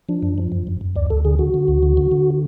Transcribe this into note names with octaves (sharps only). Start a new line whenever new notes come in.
F3 D4
F#2
F3
F#2
F#2
F#2
D2 D5
D2 A4
D3 G#4
D3 F#4
D3
D2
D3
D3
D3